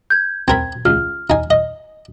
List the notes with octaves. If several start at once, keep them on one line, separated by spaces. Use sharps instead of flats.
G6 G#6
C4 A#4 B5 G#6
C#2 F6
D#4 G#5
D#5